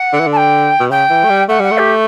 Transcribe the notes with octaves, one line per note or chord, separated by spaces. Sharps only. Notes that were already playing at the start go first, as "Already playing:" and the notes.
Already playing: F#5
D3
E3
D3
A5
G5
B2
C#3 G5
E3
A3
G3
A3 F#5
G3 F#5
A3
G4